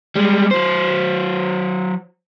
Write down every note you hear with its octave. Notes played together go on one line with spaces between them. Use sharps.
G3 G#3
F#3 C5